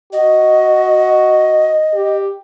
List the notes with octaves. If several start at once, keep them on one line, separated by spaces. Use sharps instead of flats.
F#4 D#5
G4